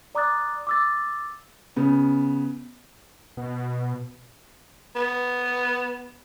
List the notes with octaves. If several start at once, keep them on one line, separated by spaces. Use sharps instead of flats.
D5 A#5 D6 D#6 F#6 A6
D6 E6 A6
C#3 B3
B2
B3